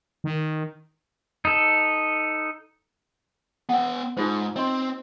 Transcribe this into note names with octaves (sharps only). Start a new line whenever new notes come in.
D#3
D#4 A4
B3 F#5 G5
G#2 D#4 F4 C5
C4 D#5 C6